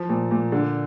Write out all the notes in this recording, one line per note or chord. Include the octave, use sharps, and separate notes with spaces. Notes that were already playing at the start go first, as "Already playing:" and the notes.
Already playing: F3
A#2
A#2
D3